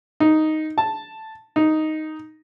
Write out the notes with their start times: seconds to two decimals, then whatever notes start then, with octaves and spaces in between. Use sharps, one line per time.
0.20 D#4
0.78 A5
1.56 D#4